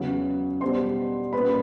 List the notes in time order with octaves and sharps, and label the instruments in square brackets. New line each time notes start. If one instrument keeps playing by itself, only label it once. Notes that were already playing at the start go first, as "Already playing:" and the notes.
Already playing: [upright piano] E2 C#3 F#3
B2 G3 B3 D4 C5 C6
A#2 G3 A#3 C#4 B4 B5